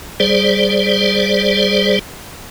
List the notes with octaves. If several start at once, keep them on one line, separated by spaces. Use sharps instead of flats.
G3 G#4 C5 D5